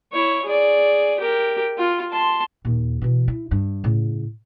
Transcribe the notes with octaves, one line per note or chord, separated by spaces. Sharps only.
E4 C#5
G#4 D5
G4 A#4
F4
A5 C6
D#2 A#2
B2 E3
E4
G2
A2 C#3